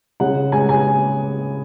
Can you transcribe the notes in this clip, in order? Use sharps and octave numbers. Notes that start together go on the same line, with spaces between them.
C#3 F#5
G#3 G#5
G#5